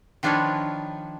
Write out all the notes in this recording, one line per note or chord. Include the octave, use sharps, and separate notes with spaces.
D#3 F3 D4 F4 B4 C#5